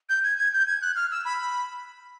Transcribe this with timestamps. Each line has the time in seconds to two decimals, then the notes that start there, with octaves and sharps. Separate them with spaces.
0.09 G6
0.23 G#6
0.38 G#6
0.53 G6
0.67 G#6
0.81 F#6
0.95 F6
1.11 E6
1.25 B5